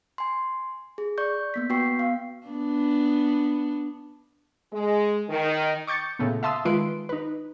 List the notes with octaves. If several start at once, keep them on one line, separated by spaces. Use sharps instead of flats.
G#5 C6
G#4
D5 C#6 G6
A#3 B3 B6
B3 F#4 B4 G5 C#6 C7
B3 F5
B3 D4
G#3
D#3
C#6 D6 G6 A6 C#7
A#2 C#3 A3 B3
E5 F5 A5 C6 D#6 E6
D#3 G#3 F4 B4 C6 D7
D#4 B4